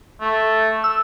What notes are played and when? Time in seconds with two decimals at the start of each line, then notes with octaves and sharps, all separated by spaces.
0.21 A3
0.84 E6